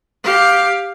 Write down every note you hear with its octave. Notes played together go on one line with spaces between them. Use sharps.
G4 F5